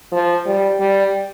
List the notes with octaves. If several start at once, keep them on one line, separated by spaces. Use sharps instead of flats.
F3
G3
G3